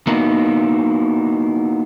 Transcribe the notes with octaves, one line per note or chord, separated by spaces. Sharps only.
A#3 B3 D#4 E4 F#4